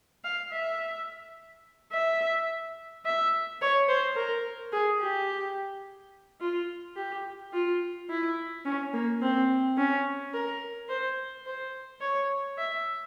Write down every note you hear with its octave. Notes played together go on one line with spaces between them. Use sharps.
F5
E5
E5
E5
C#5
C5
A#4
G#4
G4
F4
G4
F4
E4
C#4
A#3
C4
C#4
A#4
C5
C5
C#5
E5